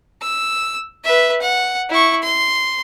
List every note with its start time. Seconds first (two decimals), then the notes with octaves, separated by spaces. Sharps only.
0.22 E6
1.04 B4 E5
1.42 F#5
1.89 E4 C#6
2.23 C6